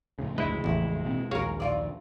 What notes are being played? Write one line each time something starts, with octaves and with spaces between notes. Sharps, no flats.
F2 A2 C#3
G1 D2 G#3 E4 B4
A1 E2
B2 A#3 C4
A#1 D#2 F#4 G#4 A#4 C#5 F5
F#2 F4 D5